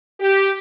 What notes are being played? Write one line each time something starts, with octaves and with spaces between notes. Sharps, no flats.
G4